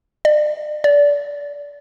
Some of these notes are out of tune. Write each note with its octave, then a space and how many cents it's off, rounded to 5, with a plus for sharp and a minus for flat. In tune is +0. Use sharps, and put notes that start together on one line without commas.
D5 +35
D5 -25